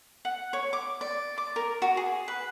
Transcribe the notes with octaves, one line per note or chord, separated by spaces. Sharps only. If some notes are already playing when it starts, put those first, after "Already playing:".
F#5
C#5
D6
D5
D6
A#4
F#4
G#4
B4